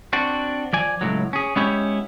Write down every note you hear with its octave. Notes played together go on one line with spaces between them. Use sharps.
C4 D4 F#4
F3 D5 G#5
C#2 A2 F#3
C#4 G#4
G#3 B3 C#4 E4 G4 C#5